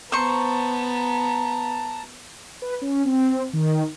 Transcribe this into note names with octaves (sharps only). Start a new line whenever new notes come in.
B3 C5 A5 A#5 C#6
B4
C#4
C4
D#3